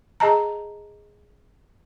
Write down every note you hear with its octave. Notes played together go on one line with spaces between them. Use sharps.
G#4 D#5 A5 A#5